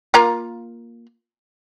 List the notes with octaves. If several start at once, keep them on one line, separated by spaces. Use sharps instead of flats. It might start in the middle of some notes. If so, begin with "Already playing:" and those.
A#3 F4 A#5